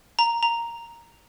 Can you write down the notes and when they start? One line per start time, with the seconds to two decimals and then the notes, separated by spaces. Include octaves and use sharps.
0.19 A#5
0.43 A#5